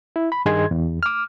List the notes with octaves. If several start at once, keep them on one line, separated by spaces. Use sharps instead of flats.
E4
B5
G2 D#3 G#4 D#5 C6 G#6
E2
D6 F6